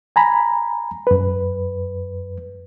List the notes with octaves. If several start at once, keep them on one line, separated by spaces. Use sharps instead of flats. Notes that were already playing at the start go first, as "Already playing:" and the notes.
G#5 A#5 B5
F#2 B4